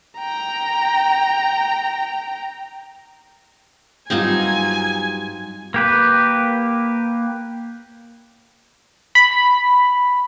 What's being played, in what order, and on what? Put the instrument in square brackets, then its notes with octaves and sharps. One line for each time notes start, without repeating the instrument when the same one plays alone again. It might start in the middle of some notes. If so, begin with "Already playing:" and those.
[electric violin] G5 A#5
[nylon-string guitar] G2 F#3 G3 [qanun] C4 D#4 F4 [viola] G#5
[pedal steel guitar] A#3 G4 B4
[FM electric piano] B5